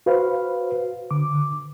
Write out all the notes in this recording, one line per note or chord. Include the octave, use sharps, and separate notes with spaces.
F#4 B4 C5 F5
D3 D6